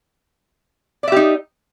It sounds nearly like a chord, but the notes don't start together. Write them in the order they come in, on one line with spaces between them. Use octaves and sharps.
D5 E5 G4 D#4